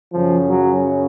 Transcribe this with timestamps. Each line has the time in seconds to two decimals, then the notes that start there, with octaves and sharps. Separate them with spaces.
0.12 F#2 C#3 F3
0.49 F#3